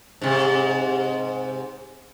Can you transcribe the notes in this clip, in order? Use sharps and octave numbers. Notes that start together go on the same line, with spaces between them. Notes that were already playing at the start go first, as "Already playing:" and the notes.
G#2 C3